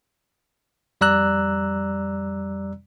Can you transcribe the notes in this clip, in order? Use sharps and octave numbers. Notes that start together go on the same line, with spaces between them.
F2 G3 D5 A#5 E6 F#6